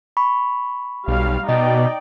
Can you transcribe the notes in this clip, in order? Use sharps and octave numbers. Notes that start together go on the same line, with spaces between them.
B5 C#6
B1 G3 F5
B2 D#4 D5 D#5 G5